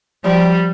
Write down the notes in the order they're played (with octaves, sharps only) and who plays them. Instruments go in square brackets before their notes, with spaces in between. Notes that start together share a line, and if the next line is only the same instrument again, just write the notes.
[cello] F3 [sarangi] G3